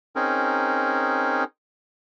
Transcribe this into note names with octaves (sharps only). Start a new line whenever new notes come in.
C4 C#4 D#4 G#4 A#4